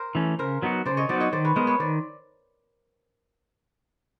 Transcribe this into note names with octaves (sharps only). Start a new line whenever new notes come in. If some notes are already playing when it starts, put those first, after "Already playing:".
Already playing: A#4 C5
E3 A3 C#4
C#3 A#4 C5
F#3 B3 D#4 F#4
C#3 C5 D5
C#5 D#5
F#3 B3 D#4 F#4 C5 D5
C#5 D#5
D#3 C5 D5
B4 C#5
G#3 B3 A#4 C5
B4 C#5
D#3 C5 D5